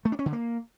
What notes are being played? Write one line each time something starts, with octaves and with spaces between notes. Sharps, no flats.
A3
D4
C#4
D3
A#3